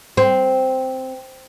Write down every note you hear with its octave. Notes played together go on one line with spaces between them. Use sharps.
C4